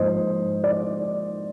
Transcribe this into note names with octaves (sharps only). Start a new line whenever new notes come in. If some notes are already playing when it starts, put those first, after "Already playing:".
Already playing: G#2 F3 A#3 C5 D#5
D5